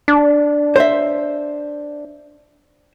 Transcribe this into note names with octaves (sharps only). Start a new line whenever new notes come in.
D4
C5 E5